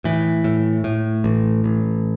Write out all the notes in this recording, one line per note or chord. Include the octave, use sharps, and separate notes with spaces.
A2 E3
A2
A2
A1
A1